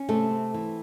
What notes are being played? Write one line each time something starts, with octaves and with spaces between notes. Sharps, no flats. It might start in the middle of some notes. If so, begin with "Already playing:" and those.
Already playing: C#4
C3 A3 A4
C4
E3